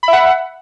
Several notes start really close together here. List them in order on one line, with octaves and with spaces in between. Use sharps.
B5 E5 F#5